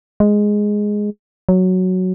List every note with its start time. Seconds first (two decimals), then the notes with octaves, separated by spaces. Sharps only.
0.20 G#3
1.49 F#3